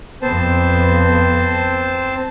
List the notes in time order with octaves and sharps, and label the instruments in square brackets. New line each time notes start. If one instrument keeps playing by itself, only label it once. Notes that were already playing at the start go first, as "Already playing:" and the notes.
[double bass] F2 B3 [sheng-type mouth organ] C4 C5 A5